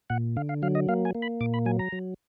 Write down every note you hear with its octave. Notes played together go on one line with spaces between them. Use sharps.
A#2 F#5
D3 F5
F5
F#3 F5
D#5
A#3 F5
G#5
A#3
B5
A#2 D6
B5
F#3 G#5
A#5
F#3